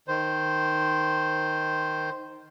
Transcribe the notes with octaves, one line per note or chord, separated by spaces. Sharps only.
D#3 C5